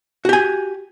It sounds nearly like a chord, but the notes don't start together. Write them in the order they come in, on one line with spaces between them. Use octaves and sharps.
F#4 G4 G#5